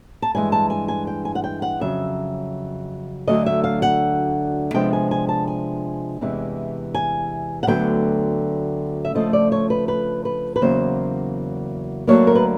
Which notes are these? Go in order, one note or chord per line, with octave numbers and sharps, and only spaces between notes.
A5
G2 E3 G#3 G#5
A5
G#5
G#5
G5
G#5
F#5
G5
F#5
F2 C#3 F#3 E5
D2 D3 F#3 D#5
E5
F5
F#5
C3 F3 G#3 B3 D4 G5
G#5
G#5
A5
G#5
E2 C3 E3 G#3
G#5
F#5
D2 D3 F#3 B3 G5
E5
C#3 F3 A3 D4 F4 D#5
D5
C#5
B4
B4
B4
B4
E2 C#3 F#3 A#3 C5
D2 D3 F#3 A#3 D4 C#5
A#4
B4